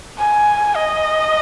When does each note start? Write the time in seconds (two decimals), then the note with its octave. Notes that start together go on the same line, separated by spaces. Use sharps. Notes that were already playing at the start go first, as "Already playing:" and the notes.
0.19 G#5
0.75 D#5